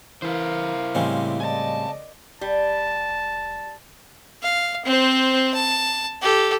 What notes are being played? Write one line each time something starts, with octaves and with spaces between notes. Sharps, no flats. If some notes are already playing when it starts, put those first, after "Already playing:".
E3 E4 A#4 C5 F5
A2 C#3 G3 G#3 C4
D5 D#5 G#5 A5
F1 G3 A5
F5
C4 C5
A5
G4 A4